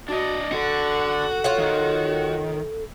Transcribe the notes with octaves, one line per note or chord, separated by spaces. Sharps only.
D4 F#4 D#5
D3 F#4 A4
F4 C#5 F#5
D#3